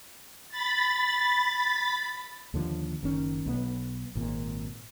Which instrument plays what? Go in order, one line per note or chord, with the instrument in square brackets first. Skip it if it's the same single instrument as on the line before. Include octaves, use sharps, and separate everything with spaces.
[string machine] B5 A6
[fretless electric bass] D#2 D3 F3
F#1 D#3 C#4
B1 B3
G#1 A#2